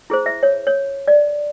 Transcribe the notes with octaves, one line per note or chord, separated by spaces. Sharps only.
E4 G#4 C5
E5
C#5
C#5
D5